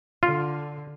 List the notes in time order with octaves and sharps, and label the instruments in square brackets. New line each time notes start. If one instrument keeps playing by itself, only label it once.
[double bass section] D3 [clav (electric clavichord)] F4